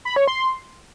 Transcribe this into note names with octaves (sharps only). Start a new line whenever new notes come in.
B5
C#5
C6